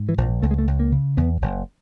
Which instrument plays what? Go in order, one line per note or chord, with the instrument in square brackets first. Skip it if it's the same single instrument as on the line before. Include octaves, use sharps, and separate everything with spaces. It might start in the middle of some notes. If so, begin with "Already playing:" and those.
Already playing: [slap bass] G#2
E3
A#1 F3
C#2 A3
G#3
A3
C#2
A#3
C#3
E2 B3
F#1